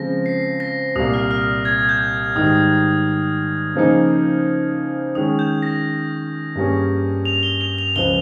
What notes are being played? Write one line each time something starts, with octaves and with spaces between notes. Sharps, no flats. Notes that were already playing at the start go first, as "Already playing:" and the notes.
Already playing: C#3 F3 G#3 C4 A#6
C7
A#6
C2 A#2 G3 A#3 D#6
F6
F6
G#6
G6
G#2 D#3 G3 D#6
C#3 F3 A#3 D#4 G#4
D#3 G#3 C#4 D#6
G6
A#6
G2 G3 A#3 C#4 G#4
F7
G7
F7
F7
C#2 C#3 F3 G7